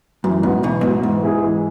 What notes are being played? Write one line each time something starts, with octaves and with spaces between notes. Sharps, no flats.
F#2 E3
G#2 B3 F#4
B1 B2 E3
G#2 B3 F#4
G#2 E3
G#3 E4 G#4
E3